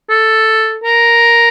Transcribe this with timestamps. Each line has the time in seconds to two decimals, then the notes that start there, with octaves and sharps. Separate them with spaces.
0.10 A4
0.84 A#4